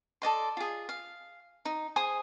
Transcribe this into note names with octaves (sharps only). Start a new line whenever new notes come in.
A4 D5 D#5 C6
F4 G#4
F5
D#4
G#4 C5 G#5 D#6